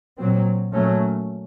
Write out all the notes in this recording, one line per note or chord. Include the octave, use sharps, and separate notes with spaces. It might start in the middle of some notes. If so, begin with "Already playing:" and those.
A#2 F#3 C4
A#2 F#3 A3 C#4